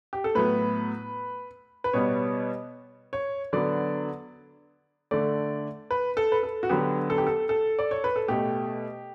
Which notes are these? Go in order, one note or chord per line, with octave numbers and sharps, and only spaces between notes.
G4
A4
A2 F#3 B3 B4
B4
B2 G3 B3 C#5
C#5
D3 F#3 B3 D5
D3 A3 D5
B4
A4
B4
A4
F#4
D3 F#3 B3 G4
A4
G4
A4
A4
D5
C#5
B4
A4
B2 A3 G4